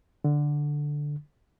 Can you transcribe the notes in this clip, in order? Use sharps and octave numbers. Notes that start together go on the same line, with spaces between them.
D3